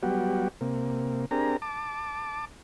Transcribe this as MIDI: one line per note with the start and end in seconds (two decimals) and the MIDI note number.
0.03 0.48 54
0.03 0.48 55
0.03 0.48 59
0.03 0.48 66
0.03 0.48 67
0.61 1.25 48
0.61 1.25 58
1.31 1.57 60
1.31 1.57 62
1.31 1.57 67
1.31 1.57 68
1.31 1.57 70
1.31 1.57 82
1.62 2.45 81
1.62 2.45 86